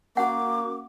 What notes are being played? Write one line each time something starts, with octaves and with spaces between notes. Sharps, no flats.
A#3 C#4 F#4 F#5 D6